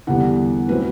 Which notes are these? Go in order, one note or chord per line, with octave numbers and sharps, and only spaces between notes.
E2 D3 G3 B3 F#5
A2 F#3 C4 B4